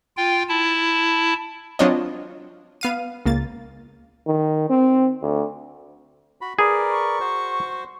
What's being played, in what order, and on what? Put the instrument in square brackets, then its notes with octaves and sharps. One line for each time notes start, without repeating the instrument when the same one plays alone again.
[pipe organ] F4 G5
E4 A5
[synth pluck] F#3 C4 D4 F4 C#5 D#5
B3 F5 D#7
C#2 A#3 A6
[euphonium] D#3
C4
D2
[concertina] F#4 B5
[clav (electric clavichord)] G#4 [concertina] A#4 B4 D5
[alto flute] C#6
[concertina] F#4 C5